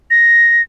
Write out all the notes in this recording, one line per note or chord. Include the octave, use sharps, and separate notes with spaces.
A#6